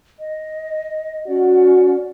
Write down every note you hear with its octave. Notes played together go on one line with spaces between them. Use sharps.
D#5
C#4 F#4 D5 F#5